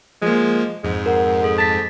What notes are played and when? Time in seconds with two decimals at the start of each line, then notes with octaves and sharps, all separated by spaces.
0.22 F3 G#3 A#3
0.84 F2 G#2 G#3
1.06 A#4 F#5
1.42 G#4 A4
1.58 A5 A6 B6